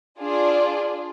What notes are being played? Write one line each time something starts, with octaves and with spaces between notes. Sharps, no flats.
D4 F4 G#4 D5